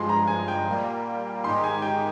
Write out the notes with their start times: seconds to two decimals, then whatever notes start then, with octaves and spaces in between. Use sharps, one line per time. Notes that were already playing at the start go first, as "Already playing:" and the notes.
Already playing: G2 F3 G#3 C6
0.09 A#5
0.27 G#5
0.48 G5
0.66 A#2 G3 A#3
1.44 G#2 D#3 G#3 D#4 G4 C6
1.64 G#5
1.82 G5